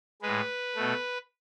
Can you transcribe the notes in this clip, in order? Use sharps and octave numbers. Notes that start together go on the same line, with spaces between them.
A2 G#3 B4
B2 A3